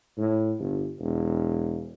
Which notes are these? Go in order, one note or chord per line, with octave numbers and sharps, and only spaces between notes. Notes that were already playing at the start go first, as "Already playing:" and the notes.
A2
G1
E1